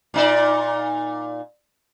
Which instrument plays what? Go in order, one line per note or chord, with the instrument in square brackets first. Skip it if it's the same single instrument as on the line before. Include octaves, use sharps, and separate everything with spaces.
[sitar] A#2 D#4 D5